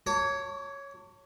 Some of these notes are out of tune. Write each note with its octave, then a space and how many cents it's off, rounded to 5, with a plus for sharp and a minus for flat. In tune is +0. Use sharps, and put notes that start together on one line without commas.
C#5 +0 A5 +35 D6 -40